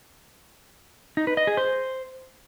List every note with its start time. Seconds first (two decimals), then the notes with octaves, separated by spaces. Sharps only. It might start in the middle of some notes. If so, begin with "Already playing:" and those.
1.17 D#4
1.27 B4
1.37 D#5
1.47 G#4
1.57 C5